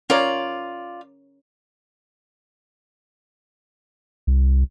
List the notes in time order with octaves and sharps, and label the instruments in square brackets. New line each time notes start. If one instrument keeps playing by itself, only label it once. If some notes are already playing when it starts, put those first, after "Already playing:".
[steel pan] C#4 A#4 C#5 [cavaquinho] F4 D5
[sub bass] C2